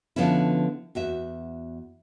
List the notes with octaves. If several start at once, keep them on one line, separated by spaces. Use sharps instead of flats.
D3 F3 B3 C#4 E4
E2 F#4 E5